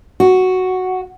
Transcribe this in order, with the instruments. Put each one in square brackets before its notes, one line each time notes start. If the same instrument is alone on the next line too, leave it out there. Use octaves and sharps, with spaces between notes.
[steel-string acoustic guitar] F#4